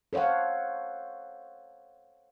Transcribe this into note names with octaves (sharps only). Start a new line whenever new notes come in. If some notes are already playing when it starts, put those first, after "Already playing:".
A4 C5 C#5 F5 F#5